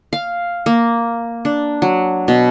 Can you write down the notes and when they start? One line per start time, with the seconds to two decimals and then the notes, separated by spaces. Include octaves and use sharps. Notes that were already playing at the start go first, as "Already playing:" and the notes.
0.13 F5
0.66 A#3
1.45 D4
1.82 F#3
2.28 B2